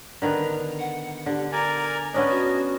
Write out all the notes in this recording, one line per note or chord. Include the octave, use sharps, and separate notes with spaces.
D3 D#3 B3 A#5
F#5
D3 G4
A#4 D5 G#5 A#5
B3 C#4 D4 D#5
F#4